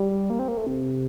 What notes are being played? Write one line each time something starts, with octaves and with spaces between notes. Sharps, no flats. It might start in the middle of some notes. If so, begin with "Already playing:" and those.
Already playing: G3
A#3
C4
A#3
A3
C3